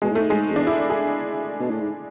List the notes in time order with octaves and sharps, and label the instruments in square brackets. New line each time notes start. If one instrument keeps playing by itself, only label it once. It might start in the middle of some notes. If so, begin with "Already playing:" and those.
[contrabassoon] B2 [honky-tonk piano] G#3
[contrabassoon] A2
[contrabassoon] G#2 [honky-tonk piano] A3
[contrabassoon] G#2 [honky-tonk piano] G#3
[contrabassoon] E2 [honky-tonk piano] D4
[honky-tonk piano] E4
G#4
[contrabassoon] B2
A2
G#2